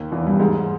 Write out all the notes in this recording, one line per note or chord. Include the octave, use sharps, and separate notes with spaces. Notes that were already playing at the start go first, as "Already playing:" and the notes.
Already playing: D#2 D#3
E2 E3
G2 G3
G#2 G#3